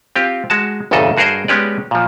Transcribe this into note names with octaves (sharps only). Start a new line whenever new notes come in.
C4 F4 G4
G#3 F#4 A5
G1 E2 A#2 C#3 A4 D#5
G2 F#4 G#4 A#4 C5 D#5
G#3 B3 C#4 G4 B4 D5
A#2 F3